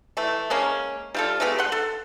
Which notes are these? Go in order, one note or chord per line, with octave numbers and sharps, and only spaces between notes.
E3 A3
G#3 A#3 C#4
G3 F4 A4
G#3 A3 B3 G4
F#5 C6
A4